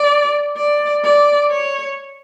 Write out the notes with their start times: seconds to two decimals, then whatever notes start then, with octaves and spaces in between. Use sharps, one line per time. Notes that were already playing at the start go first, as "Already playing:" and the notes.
Already playing: D5
0.57 D5
1.04 D5
1.50 C#5